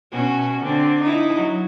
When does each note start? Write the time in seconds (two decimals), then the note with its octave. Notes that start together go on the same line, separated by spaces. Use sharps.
0.12 B2 C#4 F#4
0.61 D3 C4
1.01 D#4 E4
1.36 F#3